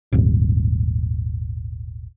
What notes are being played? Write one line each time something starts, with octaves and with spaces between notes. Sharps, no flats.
D#1 G#1